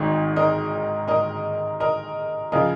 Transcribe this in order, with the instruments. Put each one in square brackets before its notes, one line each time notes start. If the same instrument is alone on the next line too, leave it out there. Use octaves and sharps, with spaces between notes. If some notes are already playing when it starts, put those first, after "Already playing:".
Already playing: [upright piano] G#1 G#2 D#3 D#5
A#4 D#5
A#4 D#5
A#4 D#5
C#3 F3 A#4 D#5